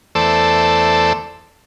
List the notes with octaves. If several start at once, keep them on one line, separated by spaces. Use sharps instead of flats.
E2 A3 A4 C5 D5 E6